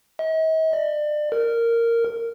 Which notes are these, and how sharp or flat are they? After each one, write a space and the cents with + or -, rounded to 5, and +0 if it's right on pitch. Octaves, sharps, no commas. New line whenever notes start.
D#5 +45
D5 +30
A#4 -10